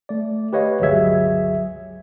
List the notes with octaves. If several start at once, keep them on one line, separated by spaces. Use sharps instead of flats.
A3 D5
G4 B4 C#5 D#5 F5
G1 C#2 F#3 G#4 E5 G#6